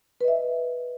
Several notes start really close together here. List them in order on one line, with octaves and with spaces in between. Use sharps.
B4 D#5 E5